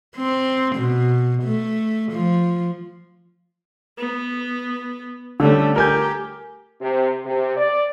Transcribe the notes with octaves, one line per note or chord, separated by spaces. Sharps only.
C4
B2
A3
F3
B3
D3 G3 A3 C#4
G4 A#4 G#5 G6
C3
C3
D5